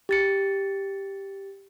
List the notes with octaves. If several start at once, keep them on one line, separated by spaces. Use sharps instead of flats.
G4 A6 C#7